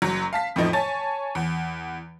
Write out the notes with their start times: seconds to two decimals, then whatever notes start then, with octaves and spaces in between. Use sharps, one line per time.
0.02 F#1 F#3
0.33 F5 A5 B6
0.56 F2 A2 E3 F3 D#4
0.73 C#5 G#5 A5 A6
1.35 E2